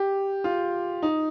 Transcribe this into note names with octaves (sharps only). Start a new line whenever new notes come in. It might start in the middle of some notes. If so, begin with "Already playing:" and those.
Already playing: G4
F4
D#4